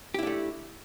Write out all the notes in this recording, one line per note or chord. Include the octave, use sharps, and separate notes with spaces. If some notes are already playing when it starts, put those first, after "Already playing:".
A3 D4 E4 G4